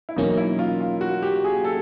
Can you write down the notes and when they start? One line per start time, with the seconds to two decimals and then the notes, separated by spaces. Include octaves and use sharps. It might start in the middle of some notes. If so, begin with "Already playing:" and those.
0.09 E4
0.16 E2 B2 F#3 A#3 C#4 D#4
0.37 E4
0.59 F4
0.81 F4
1.01 F#4
1.22 G4
1.44 G#4
1.65 A4